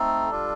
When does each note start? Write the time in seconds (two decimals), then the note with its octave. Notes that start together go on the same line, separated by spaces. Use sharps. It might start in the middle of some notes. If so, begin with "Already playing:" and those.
Already playing: A3 C4 D#4 A4
0.31 G3 D4 F4